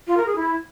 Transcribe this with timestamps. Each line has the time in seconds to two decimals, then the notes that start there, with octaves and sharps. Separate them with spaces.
0.07 F4
0.17 A#4
0.26 G#4
0.36 E4